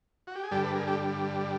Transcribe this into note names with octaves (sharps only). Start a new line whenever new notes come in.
F#4
G4
G#4
G2 D3 G3 G4 A4
A4 B4
G#4 A#4
G4 A4